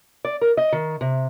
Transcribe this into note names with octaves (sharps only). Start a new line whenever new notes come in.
D5
A#4
D#5
D#3
C3